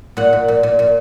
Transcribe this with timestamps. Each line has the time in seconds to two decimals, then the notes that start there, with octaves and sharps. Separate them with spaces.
0.17 A#2 F#5
0.33 A#2
0.48 A#2
0.63 A#2
0.79 A#2